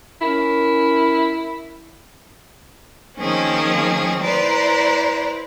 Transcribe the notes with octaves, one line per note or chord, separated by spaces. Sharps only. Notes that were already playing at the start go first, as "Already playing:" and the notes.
C#4 E4 A#4
D#3 F3 A#3 C4 C#4 G#4
E4 B4 C5 D5 A#5